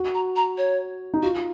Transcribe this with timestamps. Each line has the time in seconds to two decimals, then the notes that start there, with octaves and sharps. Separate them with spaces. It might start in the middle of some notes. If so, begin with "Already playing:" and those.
Already playing: F#4
0.14 A#5
0.36 A#5
0.58 C#5
1.14 D#4
1.23 F4 F#4